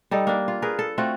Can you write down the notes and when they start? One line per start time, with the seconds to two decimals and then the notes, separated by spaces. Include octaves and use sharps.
0.11 G3 D#4 A4
0.27 A#3 D4
0.48 F4
0.62 G#4 A#4 B4
0.79 A4
0.98 A3 C4 F4 F#4